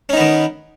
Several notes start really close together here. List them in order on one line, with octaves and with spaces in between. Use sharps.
C#4 D#4 B3 D#3